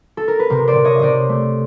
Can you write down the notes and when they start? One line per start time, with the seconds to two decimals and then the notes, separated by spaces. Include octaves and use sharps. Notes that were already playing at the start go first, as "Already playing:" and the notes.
0.17 A4
0.28 A#4
0.39 B4
0.50 C3 A#4 C5
0.67 C5 D5
0.76 C3
0.84 C#5 D#5
0.99 C3 C5 D5 D#5
1.29 A3